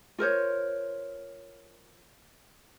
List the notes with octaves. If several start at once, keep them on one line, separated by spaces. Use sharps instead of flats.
F4 A#4 C5 C#5